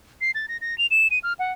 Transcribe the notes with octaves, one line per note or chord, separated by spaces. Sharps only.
C7
A6
A#6
A#6
F7
E7
D#7
F6
F#5